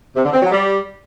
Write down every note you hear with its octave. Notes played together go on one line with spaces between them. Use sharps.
C3
D3
C4
F#3
G3